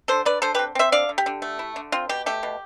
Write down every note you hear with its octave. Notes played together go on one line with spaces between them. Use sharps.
D3 A4 C5
D3 B4 D5
D3 A4 C5
G4 B4
C4
C4 C5 E5
D3 D5 F5
D3
G4
D3
A3
E4
D3
C4 F4
B2 G4
A3 G4
B2